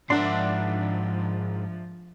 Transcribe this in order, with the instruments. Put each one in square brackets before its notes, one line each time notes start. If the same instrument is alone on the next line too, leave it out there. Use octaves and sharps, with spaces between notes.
[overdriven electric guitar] G#2 A#4 [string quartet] F3 [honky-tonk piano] D4 [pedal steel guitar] E5 F#5 C6